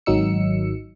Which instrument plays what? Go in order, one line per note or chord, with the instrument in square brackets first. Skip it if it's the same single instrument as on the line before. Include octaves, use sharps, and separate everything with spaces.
[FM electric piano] G#1 D#3 F#3 D#4 E6 C#7